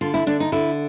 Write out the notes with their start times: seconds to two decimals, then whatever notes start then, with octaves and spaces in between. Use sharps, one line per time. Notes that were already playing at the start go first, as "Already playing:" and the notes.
0.01 D3 F4
0.14 E4
0.26 D3 D4
0.40 D#4
0.52 D3 E4